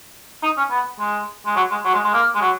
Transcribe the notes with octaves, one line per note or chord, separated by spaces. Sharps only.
D#4
C#4
B3
G#3
G#3
F#3
G#3
F#3
G#3
G#3
A#3
G#3
F#3